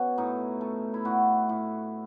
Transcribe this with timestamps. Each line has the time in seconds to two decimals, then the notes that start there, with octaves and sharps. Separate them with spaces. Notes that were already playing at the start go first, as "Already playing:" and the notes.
Already playing: B2 C#4
0.18 A2 D#4
0.61 A3
0.94 E4
1.05 A2 F#4
1.49 A2